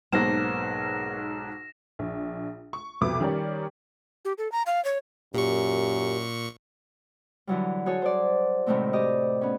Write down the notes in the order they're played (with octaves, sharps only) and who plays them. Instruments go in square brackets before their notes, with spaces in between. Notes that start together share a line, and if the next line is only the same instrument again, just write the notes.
[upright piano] B1 G#2 [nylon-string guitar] A#3 B3 C5 [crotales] A#6 E7
[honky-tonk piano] A#1
C#6
C2 F2 B2 B4 D6
D#3 G3 C#4 G4 A#4 D5
[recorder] G4
A4
A#5
F5
C#5
[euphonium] F#2 [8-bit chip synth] A#2 C#6 [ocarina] G4
[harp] D3 E3 F#3 G3
F#4 G#4 A4 C#5 G#5
C5 D5
A2 C3 D#3 G#3 A3 C4
G4 D5 D#5
B3 C#4